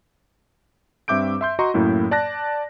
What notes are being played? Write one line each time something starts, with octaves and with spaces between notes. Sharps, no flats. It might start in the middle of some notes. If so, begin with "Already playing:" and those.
G2 C4 E5 D6 G6 D7
E5 C6 G6
F#4 D#5 A#5 C6 C#6
F#2 A2 A#3 E4
D5 A5 F#6 A#6